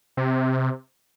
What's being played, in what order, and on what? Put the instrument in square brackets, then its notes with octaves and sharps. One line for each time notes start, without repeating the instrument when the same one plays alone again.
[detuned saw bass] C3